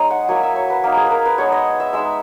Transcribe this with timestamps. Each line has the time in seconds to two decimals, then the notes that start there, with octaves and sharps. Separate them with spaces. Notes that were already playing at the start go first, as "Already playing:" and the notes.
Already playing: G#3 D#4 C#5 D#5
0.10 F#5
0.29 F#3 A#3 E4 G#5
0.43 E5
0.56 C#5
0.70 B4
0.83 A#3 D#4 A#4
0.97 G#4
1.06 A#4 B4
1.26 B4
1.38 G#3 B3 D#4 C#5
1.52 D#5
1.80 E5
1.93 G#3 D#4 E5